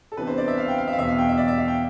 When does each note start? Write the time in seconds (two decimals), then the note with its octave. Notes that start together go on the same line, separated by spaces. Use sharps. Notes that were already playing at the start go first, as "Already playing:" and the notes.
0.12 A4
0.17 C3 E3 B3 D4 B4
0.27 C5
0.38 D5
0.48 E5
0.58 F5
0.68 G5
0.78 F5
0.88 E5
0.93 F5
0.98 E2 B2 B3 E5
1.08 F5
1.18 G5
1.29 E5
1.38 D5
1.48 E5
1.58 F5
1.68 G5